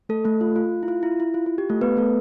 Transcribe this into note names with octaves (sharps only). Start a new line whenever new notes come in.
A3 A4
A3 A4
F4
F4
E4
F4
E4
E4
F4
F4
G4
A3 A4
B3 B4
A3 A4